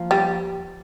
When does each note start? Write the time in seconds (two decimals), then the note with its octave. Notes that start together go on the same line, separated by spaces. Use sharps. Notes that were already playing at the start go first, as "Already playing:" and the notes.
Already playing: F3 A#3 F4
0.11 G3